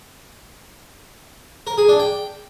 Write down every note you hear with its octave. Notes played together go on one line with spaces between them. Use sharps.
A#4
G#4
D4
G5